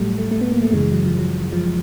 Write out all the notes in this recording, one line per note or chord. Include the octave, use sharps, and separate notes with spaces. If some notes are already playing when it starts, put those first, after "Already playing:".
Already playing: A2 F#3 G3 A3
A3
A3
B3
A#3
A3
F#2 C#3 E3 G#3
F#3
F3
F#3
F3